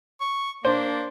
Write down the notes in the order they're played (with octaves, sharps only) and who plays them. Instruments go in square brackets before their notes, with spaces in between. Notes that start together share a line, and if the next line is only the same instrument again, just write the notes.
[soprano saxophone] C#6
[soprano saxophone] A#3 [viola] D4 [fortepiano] C5